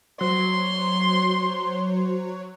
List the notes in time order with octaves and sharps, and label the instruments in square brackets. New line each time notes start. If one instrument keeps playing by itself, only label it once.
[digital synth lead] F#3 [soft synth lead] C5 [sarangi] C6